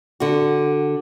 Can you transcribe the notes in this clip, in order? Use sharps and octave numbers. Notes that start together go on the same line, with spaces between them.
D3 F#4